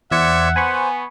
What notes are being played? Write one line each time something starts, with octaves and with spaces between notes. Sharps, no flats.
E2 C5 D5 E5 F#5 G#6 C#7
B3 C5 G#5 B5 C#6